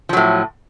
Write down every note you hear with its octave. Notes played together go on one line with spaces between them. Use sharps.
A2 F3 F#3